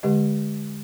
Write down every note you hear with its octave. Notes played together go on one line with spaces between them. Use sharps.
D3 G#3 G4 D#5